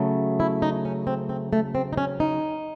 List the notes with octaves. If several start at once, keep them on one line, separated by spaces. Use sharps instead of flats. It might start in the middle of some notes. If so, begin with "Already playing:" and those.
Already playing: C#3 F#3 A3
E4
D#4
C#4
C4
C4
A3
C4
D#4
C#4
D#4